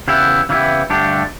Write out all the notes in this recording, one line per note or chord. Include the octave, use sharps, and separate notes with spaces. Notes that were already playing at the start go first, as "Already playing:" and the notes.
C#3 E3 B3 E4 G4
C#3 E3 B3 E4 G4
G2 D3 A3 D4 G4